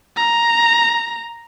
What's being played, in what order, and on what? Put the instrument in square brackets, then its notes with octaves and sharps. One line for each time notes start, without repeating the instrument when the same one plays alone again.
[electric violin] A#5